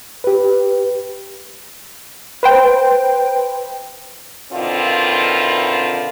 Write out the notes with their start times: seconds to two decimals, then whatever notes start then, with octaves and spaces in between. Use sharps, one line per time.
0.24 G4 B4
2.43 B4 C5 G5
4.52 B2 D3 D#3 C4 E4 F4